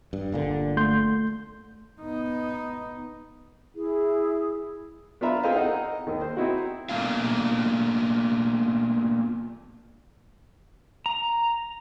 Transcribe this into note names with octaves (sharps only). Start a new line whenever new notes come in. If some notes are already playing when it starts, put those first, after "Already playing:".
G2
G1 A#2 D3
A3 C6 G6
B3 D#4
E4 G#4
B3 D4 F4 E5 A#5 B5
C4 G#4 A4 C5 D#5 F5
D#4 A#4 D#5 F#5
D#2 D#3
C5
C4 D#4 E4 F#4
A#3 B3 D4 F4 E5 F5
A#5